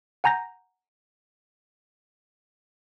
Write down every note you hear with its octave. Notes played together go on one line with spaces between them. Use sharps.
F#5 G#5 A#5 G6 A#6